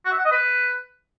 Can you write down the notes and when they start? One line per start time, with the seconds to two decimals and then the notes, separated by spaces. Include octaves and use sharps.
0.05 F#4
0.12 E5
0.18 F#5
0.25 D#5
0.31 B4